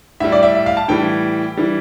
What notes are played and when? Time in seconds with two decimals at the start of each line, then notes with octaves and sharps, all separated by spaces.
0.20 A2 G3 E5
0.32 D5
0.43 E5
0.55 E5
0.66 F5
0.77 A5
0.88 A2 E3 G3 G5
1.57 E3 G3